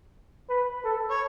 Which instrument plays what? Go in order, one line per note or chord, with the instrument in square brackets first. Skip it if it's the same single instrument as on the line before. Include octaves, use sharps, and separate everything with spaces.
[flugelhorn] B4
A4
[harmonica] C#5